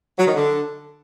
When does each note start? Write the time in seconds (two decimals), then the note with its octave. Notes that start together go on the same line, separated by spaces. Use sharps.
0.18 F#3
0.27 D#3
0.35 D3